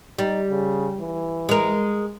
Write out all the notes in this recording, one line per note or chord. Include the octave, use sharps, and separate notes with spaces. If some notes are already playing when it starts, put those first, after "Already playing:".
G3 D#4
C#3
E3
G#3 A#4